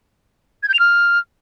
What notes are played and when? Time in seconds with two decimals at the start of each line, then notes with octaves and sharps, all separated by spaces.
0.63 G#6
0.68 G6
0.74 F7
0.79 F6